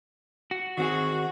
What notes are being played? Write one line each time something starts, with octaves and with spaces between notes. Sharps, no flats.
F#4
D#3 C4 F#4 G#4